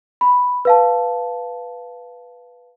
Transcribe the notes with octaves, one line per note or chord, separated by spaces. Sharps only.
B5
B4 F5 A5